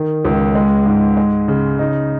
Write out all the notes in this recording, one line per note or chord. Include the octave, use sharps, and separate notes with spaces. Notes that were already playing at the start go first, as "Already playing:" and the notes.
Already playing: D#3
C#2
G#3
G#2
G#3
C#3
D#4